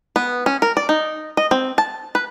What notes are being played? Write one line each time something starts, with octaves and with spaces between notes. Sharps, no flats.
B3
C#4
A#4
D5
D#4
D#5
C4
A5
B4